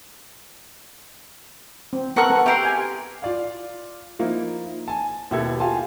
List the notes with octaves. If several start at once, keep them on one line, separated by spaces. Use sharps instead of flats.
C4
B3 A4 A#4 F#5 C#6 F#6
B3 A4
G4 A#4 E5 C6
G#5
F4 D5 F5
F3 A#3 D#4 E4
G#5 A5
D#2 B2 E4 G4 A4 G#6
F4 G4 F5 G#5 A5 C6